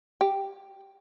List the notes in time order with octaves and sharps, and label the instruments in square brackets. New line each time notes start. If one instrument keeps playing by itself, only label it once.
[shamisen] G4